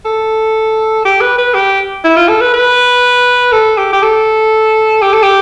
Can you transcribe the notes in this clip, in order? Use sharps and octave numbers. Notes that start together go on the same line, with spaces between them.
A4
G4
B4
B4
G4
E4
F4
A4
B4
B4
A4
G4
G4
A4
G4
A4
G4